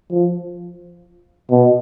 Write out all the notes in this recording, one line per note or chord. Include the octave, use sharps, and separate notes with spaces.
F3
B2